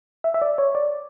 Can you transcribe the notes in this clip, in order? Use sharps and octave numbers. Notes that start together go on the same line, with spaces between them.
E5
E5
D5
C#5
D5